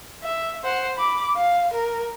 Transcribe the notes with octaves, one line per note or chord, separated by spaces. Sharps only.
E5
C5 F#5
B5 D6
F5
A#4